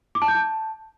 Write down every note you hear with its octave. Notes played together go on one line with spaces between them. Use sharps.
D6
A5
G6
A5